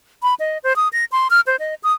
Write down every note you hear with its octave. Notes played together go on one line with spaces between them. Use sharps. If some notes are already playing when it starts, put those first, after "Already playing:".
B5
D#5
C5
D#6
A#6
C6
F6
C5
D#5
D#6